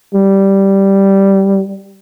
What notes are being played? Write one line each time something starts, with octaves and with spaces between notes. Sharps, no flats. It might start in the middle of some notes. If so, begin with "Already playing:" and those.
G3